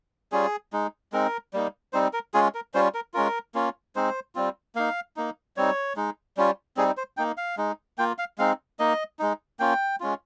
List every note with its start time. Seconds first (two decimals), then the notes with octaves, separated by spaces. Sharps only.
0.32 G3 C#4 F4 G#4
0.73 G#3 D#4
1.12 G#3 C4 D#4 A#4
1.53 G3 A#3 D#4
1.93 G3 C4 D#4 C5
2.13 A#4
2.34 G#3 C#4 F4 G#4
2.54 A#4
2.74 G3 C#4 F4 C5
2.94 A#4
3.14 G#3 C#4 F4 A#4
3.55 A#3 C#4 F4
3.96 G#3 C4 D#4 C5
4.35 G3 C4 F4
4.75 A#3 D#4 F5
5.16 A#3 D#4
5.57 G3 C4 D#4 C#5
5.96 G#3 D#4
6.37 G3 C#4 F4
6.77 G3 C4 D#4 G#4
6.97 C5
7.17 A#3 D#4 G5
7.37 F5
7.57 G#3 D#4
7.98 A#3 F4 G5
8.18 F5
8.38 G#3 C4 D#4 F5
8.79 A#3 D#4 D#5
9.19 G#3 D#4
9.59 A#3 C#4 F4 G5
10.00 G#3 C#4 F4